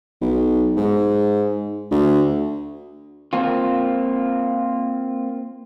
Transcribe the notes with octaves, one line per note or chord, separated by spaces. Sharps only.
B1
G#2
D2
A#3 C4 F4